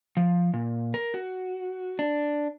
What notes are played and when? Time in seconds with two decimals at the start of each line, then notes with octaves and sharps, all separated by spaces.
0.17 F3
0.54 A#2
0.94 A#4
1.14 F#4
1.99 D4